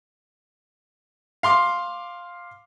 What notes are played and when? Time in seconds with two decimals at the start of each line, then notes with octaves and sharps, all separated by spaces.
1.43 F5 C6 D6